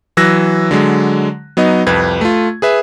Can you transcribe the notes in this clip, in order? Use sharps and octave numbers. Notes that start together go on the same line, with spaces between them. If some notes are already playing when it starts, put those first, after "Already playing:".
E3 F#3 E6 F#6 A#6
D3 F#3 G#3
F#3 B3 D#4 D#5
C2 F2 B4 G#6
A3 F4
G#4 B4 E5